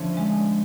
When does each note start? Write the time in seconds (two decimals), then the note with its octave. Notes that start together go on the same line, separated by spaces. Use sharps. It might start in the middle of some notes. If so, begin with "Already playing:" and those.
Already playing: D3 F3 A3 C#4
0.17 G#3